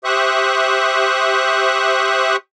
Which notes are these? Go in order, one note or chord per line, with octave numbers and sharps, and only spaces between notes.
G4 C5 E5 C#6 D#6 F#6